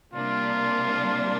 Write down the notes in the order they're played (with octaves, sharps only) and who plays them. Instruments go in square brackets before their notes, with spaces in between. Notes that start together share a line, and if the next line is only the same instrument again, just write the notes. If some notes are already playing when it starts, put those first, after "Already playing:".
[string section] C3 G3 A#3 D4 [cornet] F4